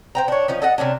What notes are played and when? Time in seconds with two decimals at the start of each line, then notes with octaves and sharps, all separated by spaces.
0.15 C5 G5 A#5
0.28 D4 C#5
0.48 F3 C#4 D#4
0.62 A4 D#5 F#5
0.78 C3 B3 C#4 D4